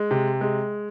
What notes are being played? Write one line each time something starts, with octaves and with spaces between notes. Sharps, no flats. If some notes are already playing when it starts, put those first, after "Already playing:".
Already playing: G#3
C3
G#3